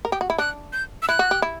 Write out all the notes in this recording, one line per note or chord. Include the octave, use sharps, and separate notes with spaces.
A#4
G4
F#4
E4
D4 F#6
G6
E6
E4 F#6
F#4
G4
E4